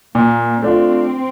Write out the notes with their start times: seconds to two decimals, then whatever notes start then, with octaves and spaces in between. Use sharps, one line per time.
0.15 A#2 A#3
0.62 A3 C4 D4 F4